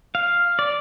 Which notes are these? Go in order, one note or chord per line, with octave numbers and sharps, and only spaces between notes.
F5
D5